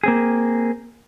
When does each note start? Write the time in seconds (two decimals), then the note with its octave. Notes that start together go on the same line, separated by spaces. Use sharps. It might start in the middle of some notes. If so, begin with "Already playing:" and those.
0.04 A#3 C4 G#4